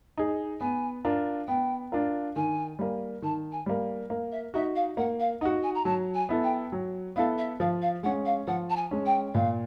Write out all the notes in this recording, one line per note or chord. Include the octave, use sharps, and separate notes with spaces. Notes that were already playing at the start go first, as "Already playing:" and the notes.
D#4 G#4
B3 G#5
D4 F4 A#4
B3 G5
D4 F4 A#4
D#3 G#5
G3 A#3
D#3 A5
G#5
G3 A#3
A#3
E5
D#4 F#4 E5
F5
A#3 F#5
F5
D#4 F#4 F#5
G#5
A#5
F#3 A5
G#5
B3 E4 A4
G5
F#3
B3 E4 A4 F5
E5
F3 F5
F5
G#3 C#4 F#5
F5
F3 F#5
A5
G#5
G#3 C#4
G5
A#2 F5